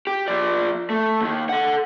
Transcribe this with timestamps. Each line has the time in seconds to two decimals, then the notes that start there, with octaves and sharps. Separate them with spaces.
0.07 G4
0.28 F3 D5
0.90 A3
1.20 D#2 D#3
1.49 A4 F#5